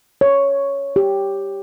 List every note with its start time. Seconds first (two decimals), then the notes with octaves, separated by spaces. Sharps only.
0.21 C#5
0.96 G4